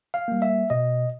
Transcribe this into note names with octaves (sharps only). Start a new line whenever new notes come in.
F5
G3 A#3
E5
B2 D#5